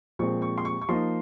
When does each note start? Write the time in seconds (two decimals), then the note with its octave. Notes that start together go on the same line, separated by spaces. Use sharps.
0.19 A#2 F3 G#3 C4 C#6
0.42 C#6
0.58 C6
0.65 C#6
0.81 C#6
0.89 F3 A#3 D#4 C6